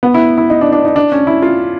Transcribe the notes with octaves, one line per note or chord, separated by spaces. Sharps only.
B3
E4
E4
D#4
D4
D4
D#4
D4
C#4
E4
F4